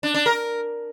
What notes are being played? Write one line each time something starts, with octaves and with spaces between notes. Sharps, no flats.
D4
D4
A#4